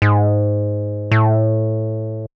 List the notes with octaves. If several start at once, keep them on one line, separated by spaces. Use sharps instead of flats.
G#2
A2